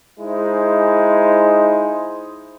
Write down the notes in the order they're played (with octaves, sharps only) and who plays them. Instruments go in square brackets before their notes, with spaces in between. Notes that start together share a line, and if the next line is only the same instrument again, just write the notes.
[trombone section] G#3 D#4 E4 C5